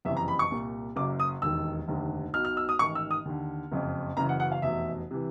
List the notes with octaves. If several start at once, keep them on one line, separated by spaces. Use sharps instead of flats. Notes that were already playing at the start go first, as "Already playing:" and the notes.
F#1 F2 C3 E3 E5
A#5
B5
C#6
C2 A#2
F#1 F#2 C#3 D6
D#6
E1 D#2 D#3 E6
F1 D#2 D3
B1 B2 F6
F6
E6
D#6
A1 G#2 D#3 C#6
E6
D#6
D#2 D3
F#1 F2 C#3
F#1 F#2 C#3 E3 A#5
F#5
F#5
F5
F1 E2 B2 E5
C3 E3